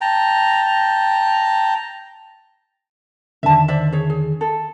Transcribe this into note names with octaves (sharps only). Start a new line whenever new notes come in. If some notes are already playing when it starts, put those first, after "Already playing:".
G5 A5 A#5
E2 D3 D#3 E5 A5
C5 D5 E5
G#4 C#5
G#4
A4